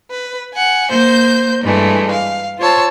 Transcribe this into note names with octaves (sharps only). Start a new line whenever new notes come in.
B4
F#5 G#5
A#3 C5 G6
G2 E3 G#3 A3
F5
F4 C5 C#5 A5 E6